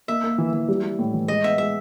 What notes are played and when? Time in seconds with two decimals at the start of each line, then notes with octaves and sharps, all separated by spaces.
0.08 A#3 E5
0.24 A#3
0.38 E3
0.53 E3
0.68 G3
0.83 G3
0.99 A2
1.13 E3
1.28 G#3 D#5
1.44 B3 E5
1.58 G#3 E5